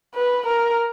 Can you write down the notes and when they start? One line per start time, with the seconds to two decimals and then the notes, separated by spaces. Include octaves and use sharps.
0.15 B4
0.46 A#4